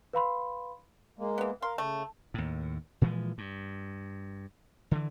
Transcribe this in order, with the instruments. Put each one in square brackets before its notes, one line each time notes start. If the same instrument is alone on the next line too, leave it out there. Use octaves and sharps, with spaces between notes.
[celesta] B4 F5 B5 C6
[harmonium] G#3 A#3
[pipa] E3 B3
[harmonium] A#4 F5 [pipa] C6
[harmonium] C#3 [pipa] A3
[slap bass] D#2 A2
A#2 E3 F3 G#3
G2
D3 E3